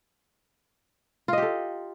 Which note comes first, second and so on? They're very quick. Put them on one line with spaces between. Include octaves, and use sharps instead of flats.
F4 D#5 G4 A4